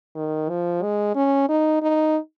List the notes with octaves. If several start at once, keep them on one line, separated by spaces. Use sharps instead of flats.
D#3
F3
G#3
C#4
D#4
D#4